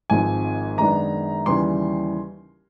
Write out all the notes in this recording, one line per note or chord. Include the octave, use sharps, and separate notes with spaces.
G#1 G#2 F3 G#3 C4 G#5
F#2 D#3 G#3 B3 D4 A#5
D#2 C#3 E3 G3 C6